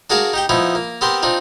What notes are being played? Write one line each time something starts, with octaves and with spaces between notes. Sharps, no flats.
D4 F#4 G#4 A#4 F5 A5
D#4 G4 G5
F3 B3 D#4 E4
A#3
B3 C4 G4 A#4 C5
C4 D4 D#4 F4